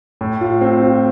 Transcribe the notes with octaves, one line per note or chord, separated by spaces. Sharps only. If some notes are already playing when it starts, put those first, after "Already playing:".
A2
F4
C4
F4